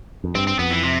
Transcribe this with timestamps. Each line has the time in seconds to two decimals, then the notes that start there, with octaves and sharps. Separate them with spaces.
0.24 F2
0.35 G2 C4
0.47 C4
0.59 F2 B3
0.71 E3
0.83 C3